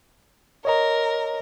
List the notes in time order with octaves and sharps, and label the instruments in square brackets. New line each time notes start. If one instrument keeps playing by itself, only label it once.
[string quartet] A#4 [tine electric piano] C#5 D#5 A#5